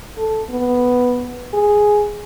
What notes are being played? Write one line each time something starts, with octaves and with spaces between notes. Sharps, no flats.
A4
B3
G#4